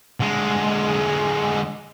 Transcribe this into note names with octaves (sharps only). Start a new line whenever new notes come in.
D3 G#3